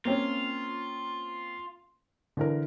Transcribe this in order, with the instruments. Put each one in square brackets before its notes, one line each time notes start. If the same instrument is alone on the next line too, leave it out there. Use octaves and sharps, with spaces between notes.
[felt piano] A#3 C4 C#4 [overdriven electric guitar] F4
[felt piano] D3 E3 A#4